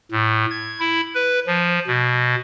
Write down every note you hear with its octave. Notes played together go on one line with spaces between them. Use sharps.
A2
G#6
E4
B4
F3
B2